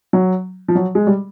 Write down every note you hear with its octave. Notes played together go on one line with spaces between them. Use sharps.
F#3
F3
F#3
G#3
G3